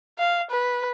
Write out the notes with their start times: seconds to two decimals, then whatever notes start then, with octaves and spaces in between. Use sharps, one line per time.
0.18 F5
0.51 B4